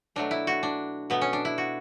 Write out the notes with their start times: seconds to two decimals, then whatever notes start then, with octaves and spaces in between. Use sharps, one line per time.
0.16 B2 F#3 A3 D4
0.31 E4
0.47 F#4
0.63 D4
1.10 B2 F#3 A3 B3
1.21 C#4
1.33 D4
1.45 E4
1.58 F#4